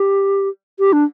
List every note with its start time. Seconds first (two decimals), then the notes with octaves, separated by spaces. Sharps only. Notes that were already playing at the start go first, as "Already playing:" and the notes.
Already playing: G4
0.79 G4
0.93 D4